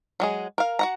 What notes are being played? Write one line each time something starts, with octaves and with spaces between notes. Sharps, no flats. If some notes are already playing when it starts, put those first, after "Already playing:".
F#3 G#3 G#4
A#4 F5
F#4 F#5 A#5